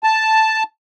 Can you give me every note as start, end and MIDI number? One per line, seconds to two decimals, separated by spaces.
0.04 0.63 81